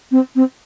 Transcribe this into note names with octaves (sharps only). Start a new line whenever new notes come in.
C4
C4